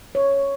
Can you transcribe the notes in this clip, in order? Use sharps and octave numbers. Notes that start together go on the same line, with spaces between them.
C#5